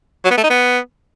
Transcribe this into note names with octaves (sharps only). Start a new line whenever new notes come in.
F#3
B3
A3
D#4
B3